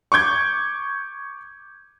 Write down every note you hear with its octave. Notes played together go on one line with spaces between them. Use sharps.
C#6 D6 G6 G#6